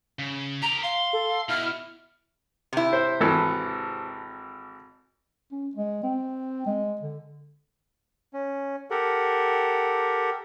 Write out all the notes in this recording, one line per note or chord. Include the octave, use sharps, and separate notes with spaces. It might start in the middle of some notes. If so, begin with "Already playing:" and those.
C#3
G4 A#4 A#5
F5 C6
A4
B2 E4 F6
C3 E4
C5
G#1 E3 A4
C#4
G#3
C4
G#3
D3
C#4
G4 A4 A#4 F#5